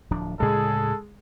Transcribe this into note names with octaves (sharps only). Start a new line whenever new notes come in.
D1 F3 D4
D2 A2 C#3 G#3 G#4 A4